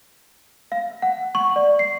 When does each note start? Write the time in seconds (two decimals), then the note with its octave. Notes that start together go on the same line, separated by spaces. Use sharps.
0.72 F5
1.02 F#5
1.35 C#6
1.56 D5
1.79 C7